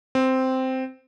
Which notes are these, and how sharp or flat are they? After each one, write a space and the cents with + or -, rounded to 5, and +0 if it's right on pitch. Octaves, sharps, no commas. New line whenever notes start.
C4 -5